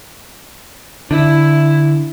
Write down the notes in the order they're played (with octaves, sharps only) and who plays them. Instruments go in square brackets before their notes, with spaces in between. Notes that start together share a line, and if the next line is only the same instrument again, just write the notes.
[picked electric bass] D3 [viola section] E4